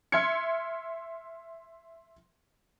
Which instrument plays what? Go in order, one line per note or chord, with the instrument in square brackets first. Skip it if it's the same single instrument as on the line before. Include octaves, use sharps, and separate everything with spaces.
[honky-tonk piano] E5 C6 F6 G#6 C#7